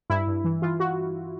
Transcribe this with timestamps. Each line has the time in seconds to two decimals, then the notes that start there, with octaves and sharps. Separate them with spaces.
0.10 G2 E4
0.27 G2
0.44 E3
0.62 E3 F4
0.80 F#4